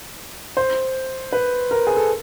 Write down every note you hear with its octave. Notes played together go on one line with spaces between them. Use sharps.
C5
B4
A#4
G#4
A4